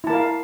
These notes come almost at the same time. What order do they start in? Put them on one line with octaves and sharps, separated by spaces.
E4 A5 A#4 F5